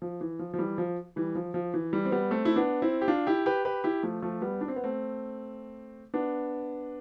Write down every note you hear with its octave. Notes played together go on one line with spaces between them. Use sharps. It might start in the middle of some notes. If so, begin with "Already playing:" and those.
F3
E3
F3
F3
E3 G3
F3
E3 G3
F3
F3
E3
E3 G3
C4
G3 B3
A3 C4
E4
B3 D4
C4 E4
G4
D4 F4
E4 G4
G4 B4
G4 B4
E4 G4
F3 A3
F3 A3
G3 B3
D4
C4
B3
A3 C4
B3 D4